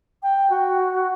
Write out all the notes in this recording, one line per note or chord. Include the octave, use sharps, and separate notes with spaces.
G5
F#4